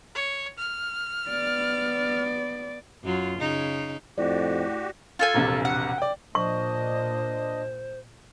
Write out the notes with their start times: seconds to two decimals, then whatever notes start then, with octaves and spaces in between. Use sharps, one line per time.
0.15 C#5
0.58 F6
1.29 B3 D5
3.03 F#2 F#3 F4
3.39 C#3 D#4
4.18 F2 A2 F#4 G4 D5
5.19 F4 A4 G#5
5.34 E1 A#1 C3
5.65 F#5
5.98 D5 G5
6.35 A#2 D4 C5 D#5 C#6